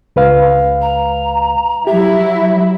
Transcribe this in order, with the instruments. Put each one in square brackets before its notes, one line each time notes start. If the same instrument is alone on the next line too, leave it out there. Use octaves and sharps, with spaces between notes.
[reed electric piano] C#2 B4 F5
[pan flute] A#5
[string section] F#3 E4 [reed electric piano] G4 [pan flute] E5